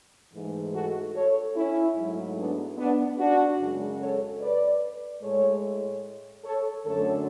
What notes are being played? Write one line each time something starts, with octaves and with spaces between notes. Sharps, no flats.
G#2 E3 A3
F#4 A4
A4 C#5
C#4 E4
G#2 F#3 A3
B3 D4
B3 D4
D4 F#4
F#2 C#3 G#3
A4 C#5
B4 D5
A2 G#3 A4 C#5
A4 C#5
F#2 D3 F#3 A3 A4 C#5